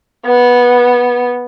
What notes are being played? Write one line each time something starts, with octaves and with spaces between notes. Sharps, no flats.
B3